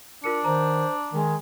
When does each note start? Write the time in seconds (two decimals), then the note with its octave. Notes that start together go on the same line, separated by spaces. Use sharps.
0.24 D4 F4 A#4 C#7
0.44 D#3 C5 A#5
1.13 D#3 G#3